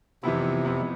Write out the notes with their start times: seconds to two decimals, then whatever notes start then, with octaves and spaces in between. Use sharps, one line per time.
0.23 F2 C3 E3 B3 E4
0.65 F2 E3 B3 E4